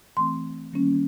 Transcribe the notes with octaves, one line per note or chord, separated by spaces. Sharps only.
E3 A3 C4 C6
D#3 G3 A#3 C#4